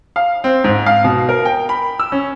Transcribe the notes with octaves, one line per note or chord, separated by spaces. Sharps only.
F5
C4
G#2
F5
B2
A#4
G5
B5
E6
C#4